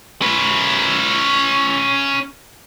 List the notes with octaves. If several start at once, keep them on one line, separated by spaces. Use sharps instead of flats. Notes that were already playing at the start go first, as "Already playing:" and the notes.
C#4 B4